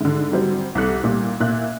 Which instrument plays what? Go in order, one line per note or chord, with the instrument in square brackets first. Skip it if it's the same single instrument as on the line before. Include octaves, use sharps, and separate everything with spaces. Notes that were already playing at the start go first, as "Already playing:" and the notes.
[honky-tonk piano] G#2 D3
F#3 G3 C4
C2 C3 A4 F#6 C#7
A#2 G3
A#2 E5 F#6